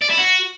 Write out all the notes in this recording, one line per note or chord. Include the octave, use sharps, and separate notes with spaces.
D5
E4
F#4